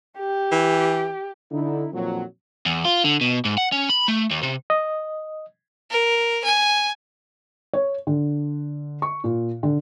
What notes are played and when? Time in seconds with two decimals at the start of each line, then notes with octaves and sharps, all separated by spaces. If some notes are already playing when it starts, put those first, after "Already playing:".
0.19 G4
0.52 E3
1.51 D3 D#4 E4
1.92 F2 A#2 D#3 F3 F#3
2.66 E2
2.85 F4
3.04 D3
3.21 B2
3.45 G#2
3.58 F#5
3.72 C#4
3.90 B5
4.08 A3
4.31 D#2
4.43 C3
4.70 D#5
5.90 A#4
6.44 G#5
7.73 C#5
8.07 D3
9.02 C#6
9.24 A#2
9.63 D3